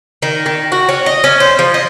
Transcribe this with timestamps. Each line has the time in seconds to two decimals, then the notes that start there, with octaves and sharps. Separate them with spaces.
0.23 D#3
0.46 D#3
0.72 F#4
0.89 C#4
1.06 D#5
1.24 C#4
1.40 C5
1.59 F3
1.74 D#5